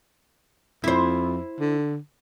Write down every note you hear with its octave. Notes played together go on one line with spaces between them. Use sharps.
F2 E4 C5
D3